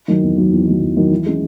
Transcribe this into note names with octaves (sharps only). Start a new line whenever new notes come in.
D#3 F#3
E2
D#3 F#3
E2
D#3 F#3
E2
D#3 F#3
E3
G#3 C#4